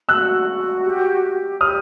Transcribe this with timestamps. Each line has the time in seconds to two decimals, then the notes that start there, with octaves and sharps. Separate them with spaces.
0.09 F#4 E6 F#6
0.47 F#4
0.85 G4
1.23 G4
1.60 G4 D#6 F6